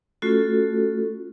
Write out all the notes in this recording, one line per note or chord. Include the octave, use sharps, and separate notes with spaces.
A3 C#4 F4 F#4 A4